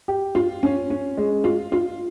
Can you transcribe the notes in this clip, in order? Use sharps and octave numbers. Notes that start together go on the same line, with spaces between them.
G4
F4
C#4
C#4
G#3
F4
F4